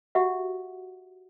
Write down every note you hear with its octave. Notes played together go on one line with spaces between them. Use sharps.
F#4 G4 E5 F#5